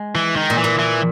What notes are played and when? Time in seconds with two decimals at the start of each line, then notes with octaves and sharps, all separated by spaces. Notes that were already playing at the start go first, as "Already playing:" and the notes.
Already playing: G#3
0.15 E3
0.36 D#3
0.50 A#2
0.58 E3
0.64 A#2
0.79 E3